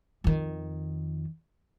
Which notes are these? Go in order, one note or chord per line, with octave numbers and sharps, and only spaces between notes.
F2 D#3